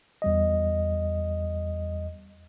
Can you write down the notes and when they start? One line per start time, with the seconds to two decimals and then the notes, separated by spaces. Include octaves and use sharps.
0.22 E2 G3 D#5